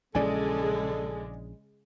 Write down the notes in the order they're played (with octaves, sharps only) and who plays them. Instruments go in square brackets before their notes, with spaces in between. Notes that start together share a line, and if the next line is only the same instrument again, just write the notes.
[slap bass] A#1 E3 C#4 [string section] C#3 G#3 [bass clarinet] A4 [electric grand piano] D5 G#5